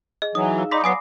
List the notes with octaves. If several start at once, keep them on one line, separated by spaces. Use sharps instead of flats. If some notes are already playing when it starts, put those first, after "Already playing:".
G#4 D#5
E3 F#3 D#4 G#4 D#6
F5 E6
D#4 D5 B5 C6 D6 A#6 B6
F#3 B3 G#5 D#6 C7